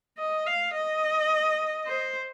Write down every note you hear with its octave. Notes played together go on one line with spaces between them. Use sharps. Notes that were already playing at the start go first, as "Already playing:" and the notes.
D#5
F5
D#5
C5